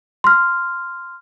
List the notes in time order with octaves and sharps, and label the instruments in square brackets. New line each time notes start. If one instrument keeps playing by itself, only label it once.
[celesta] C6 F6